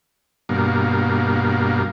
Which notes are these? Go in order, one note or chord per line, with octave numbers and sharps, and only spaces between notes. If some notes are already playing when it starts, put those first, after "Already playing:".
G2 B2 A#3